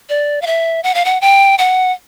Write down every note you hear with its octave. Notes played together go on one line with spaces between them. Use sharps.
D5
F5
E5
F#5
F5
F#5
G5
F#5